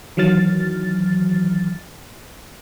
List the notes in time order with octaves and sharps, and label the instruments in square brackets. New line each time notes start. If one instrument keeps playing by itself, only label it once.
[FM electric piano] D#3 E3 F#3 F6 A6